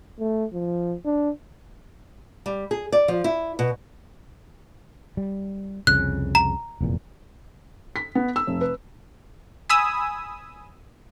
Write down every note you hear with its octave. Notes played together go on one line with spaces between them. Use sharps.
A3
F3
D4
G3
G#4
D5
F3
E4
B2
G3
C2 F2 C#3 F#6
A#5
F1 E2 A#2
B6
B3
E6
F1
B4
G#5 B5 D#6 E6